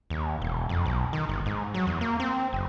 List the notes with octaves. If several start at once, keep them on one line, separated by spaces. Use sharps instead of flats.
D#2
E1
F2
B1
D#3
G1
G#2
F#3
E2
A#3
C4
F#1